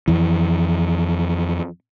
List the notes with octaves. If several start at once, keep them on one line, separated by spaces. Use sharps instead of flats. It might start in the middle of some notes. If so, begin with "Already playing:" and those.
F2 E3